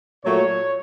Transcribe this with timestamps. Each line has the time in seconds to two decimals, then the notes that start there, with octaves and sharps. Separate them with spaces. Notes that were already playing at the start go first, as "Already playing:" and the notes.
0.24 A#2 F#3 A3 C#5